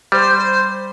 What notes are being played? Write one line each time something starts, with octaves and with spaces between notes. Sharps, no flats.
G3 C5